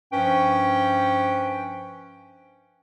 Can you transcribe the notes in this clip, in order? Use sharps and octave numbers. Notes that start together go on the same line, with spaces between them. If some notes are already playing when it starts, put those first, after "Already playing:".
G2 F3 C#4 B4 G5